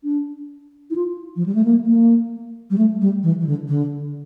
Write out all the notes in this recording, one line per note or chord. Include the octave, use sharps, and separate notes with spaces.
D4
E4
F4
F3
G3
A3
A#3
A#3
G3
A3
G3
E3
E3
D3
D3